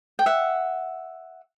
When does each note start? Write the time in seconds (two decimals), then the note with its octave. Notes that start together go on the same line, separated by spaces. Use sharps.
0.19 G5
0.26 E5 F#5